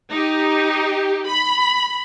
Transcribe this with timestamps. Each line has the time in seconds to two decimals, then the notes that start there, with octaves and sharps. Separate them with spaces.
0.11 D#4 G4
1.26 B5